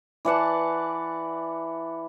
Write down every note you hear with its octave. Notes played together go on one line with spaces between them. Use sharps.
E3 D5 F#5 A5